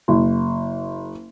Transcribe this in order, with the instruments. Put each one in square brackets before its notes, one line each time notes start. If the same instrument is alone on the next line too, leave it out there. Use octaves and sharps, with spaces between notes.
[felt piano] F#1